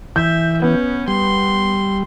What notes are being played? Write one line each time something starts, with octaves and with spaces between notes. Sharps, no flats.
E3 E5 G6
B3 C#4
G3 C6